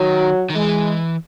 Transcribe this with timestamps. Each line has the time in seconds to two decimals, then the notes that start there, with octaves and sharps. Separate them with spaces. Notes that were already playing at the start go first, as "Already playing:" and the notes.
Already playing: D#3 F#3
0.50 D#3
0.55 E3 G#3